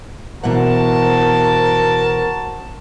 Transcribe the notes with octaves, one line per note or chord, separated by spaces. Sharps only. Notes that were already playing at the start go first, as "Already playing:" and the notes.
B2 E3 F#4 A#4 C5 F#5 A5